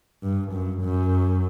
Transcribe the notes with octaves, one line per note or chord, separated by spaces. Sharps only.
G2
F#2
F#2